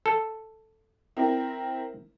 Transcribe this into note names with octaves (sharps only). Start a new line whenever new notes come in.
A4
C4 E4 A#4